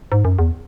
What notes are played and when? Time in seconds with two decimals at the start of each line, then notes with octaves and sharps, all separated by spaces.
0.12 G#2
0.25 F#2
0.39 E2